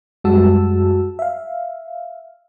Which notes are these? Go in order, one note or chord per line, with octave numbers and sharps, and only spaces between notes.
F#2 G3 G#3 F#4 A5 E6
E5 F5